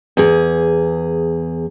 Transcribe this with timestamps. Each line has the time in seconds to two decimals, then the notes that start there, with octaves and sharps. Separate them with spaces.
0.17 E2 G#4